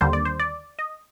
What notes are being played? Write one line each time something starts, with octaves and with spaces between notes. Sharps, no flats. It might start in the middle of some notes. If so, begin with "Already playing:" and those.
D#2 D3 G3 A#3 C5
D5
C5
D5
D#5